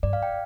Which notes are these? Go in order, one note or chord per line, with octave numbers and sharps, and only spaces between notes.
G2 D5
F5
G5